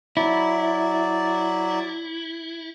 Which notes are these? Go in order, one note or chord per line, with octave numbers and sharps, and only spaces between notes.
F#3 E4 D5